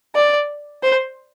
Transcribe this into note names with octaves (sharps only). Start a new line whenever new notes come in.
D5
C5